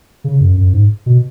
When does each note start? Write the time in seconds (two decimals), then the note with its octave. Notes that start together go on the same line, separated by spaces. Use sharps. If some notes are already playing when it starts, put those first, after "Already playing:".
0.24 C#3
0.40 F#2
0.58 F#2
0.73 G#2
1.06 B2